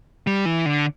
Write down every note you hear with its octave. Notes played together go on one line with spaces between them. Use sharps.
G3
E3
D3